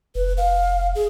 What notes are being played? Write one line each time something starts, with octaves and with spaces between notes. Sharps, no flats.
F1 B4
F5
G#4